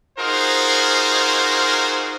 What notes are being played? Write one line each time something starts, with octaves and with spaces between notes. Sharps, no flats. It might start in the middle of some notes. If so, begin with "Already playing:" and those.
D#4 F4 F#4 G#4 A#4 C5